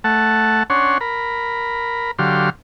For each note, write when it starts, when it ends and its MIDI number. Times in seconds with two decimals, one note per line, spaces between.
0.04 0.63 57
0.04 0.63 78
0.04 0.63 81
0.70 0.98 61
0.70 0.98 62
0.70 0.98 73
0.70 0.98 78
0.70 0.98 84
1.01 2.11 70
1.01 2.11 83
2.19 2.50 50
2.19 2.50 54
2.19 2.50 67
2.19 2.50 77
2.19 2.50 84